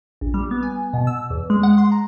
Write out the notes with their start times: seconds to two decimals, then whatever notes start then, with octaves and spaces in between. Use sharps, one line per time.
0.21 A#1
0.34 G3
0.51 B3
0.63 G#5
0.93 B2
1.07 E6
1.30 E2
1.50 G#3
1.63 F#5
1.78 C6
1.92 A#5